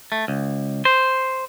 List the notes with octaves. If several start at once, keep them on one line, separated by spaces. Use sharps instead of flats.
A3
C#2
C5